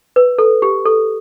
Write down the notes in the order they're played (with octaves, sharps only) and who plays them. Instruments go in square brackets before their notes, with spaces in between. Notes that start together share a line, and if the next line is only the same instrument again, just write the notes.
[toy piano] B4
A4
G4
A4